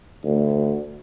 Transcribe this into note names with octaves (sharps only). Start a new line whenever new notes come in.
D2